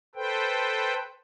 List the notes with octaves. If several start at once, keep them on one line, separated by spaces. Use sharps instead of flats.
A4 B4 C5 G5